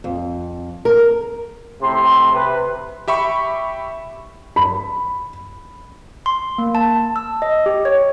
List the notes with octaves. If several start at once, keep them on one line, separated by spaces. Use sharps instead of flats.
F2
A#4
A2 C3 E5 C6
C3 B4
G4 E5 B5 C#6
B5
C6
A#3
A5
E6
D#5
G4
C#5